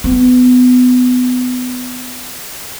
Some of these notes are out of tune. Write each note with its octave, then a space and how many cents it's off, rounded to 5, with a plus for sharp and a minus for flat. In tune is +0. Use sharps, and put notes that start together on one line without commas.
B3 +25